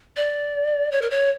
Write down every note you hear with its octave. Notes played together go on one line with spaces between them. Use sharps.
D5
C#5
A#4
C#5